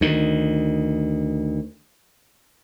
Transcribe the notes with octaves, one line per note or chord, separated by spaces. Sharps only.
D2 D#3